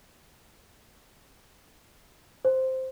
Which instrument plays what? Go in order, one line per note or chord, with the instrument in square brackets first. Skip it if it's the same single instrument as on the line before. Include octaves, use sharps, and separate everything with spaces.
[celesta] C5